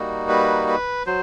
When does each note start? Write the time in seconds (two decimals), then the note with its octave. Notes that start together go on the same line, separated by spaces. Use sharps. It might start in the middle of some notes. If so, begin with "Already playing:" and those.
Already playing: G3 A#3 D#4 F#4
0.29 B4
0.68 B4
1.06 F#3 C5